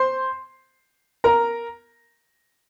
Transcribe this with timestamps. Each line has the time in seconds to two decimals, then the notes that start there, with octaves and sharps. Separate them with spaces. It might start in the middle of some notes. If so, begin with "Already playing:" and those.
Already playing: C5 C6
1.24 A#4 A#5